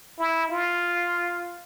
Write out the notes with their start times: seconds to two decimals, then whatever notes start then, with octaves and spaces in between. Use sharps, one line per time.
0.19 E4
0.50 F4